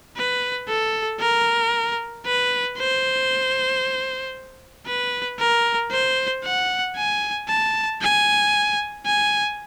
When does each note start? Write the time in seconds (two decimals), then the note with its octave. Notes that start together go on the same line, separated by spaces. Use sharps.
0.17 B4
0.68 A4
1.20 A#4
2.26 B4
2.78 C5
4.87 B4
5.39 A#4
5.91 C5
6.44 F#5
6.96 G#5
7.49 A5
8.02 G#5
9.06 G#5